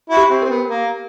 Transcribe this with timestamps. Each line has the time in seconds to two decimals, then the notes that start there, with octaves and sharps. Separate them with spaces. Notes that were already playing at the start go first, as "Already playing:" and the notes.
0.10 E4 F#4
0.17 G4
0.30 C4
0.42 C4 A#4
0.49 B3
0.69 A#3